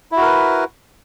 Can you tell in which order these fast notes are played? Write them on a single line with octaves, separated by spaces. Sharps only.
E4 F#4 A#4 B4